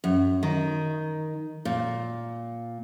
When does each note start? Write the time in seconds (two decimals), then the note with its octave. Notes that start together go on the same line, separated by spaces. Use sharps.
0.04 F#2
0.43 D#3
1.65 A#2